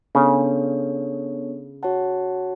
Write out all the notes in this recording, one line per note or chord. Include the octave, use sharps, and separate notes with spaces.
C#3 B3 D4 A4 C#5
F#4 C#5 F#5 A5